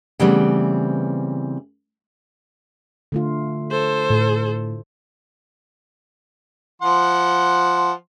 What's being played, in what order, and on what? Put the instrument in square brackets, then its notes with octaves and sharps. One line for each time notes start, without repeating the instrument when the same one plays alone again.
[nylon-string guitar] C#3 E3 G3 A3 B3 C4
[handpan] D3 A3 F4
[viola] A4 C5
[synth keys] A2
[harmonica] F3 F#5 C6